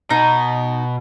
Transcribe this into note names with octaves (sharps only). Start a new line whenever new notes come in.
B2 D#4